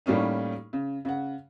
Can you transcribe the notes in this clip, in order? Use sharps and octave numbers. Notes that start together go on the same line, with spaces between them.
A2 G3 A#3 C#4 D#4
C#3
C#3 F#5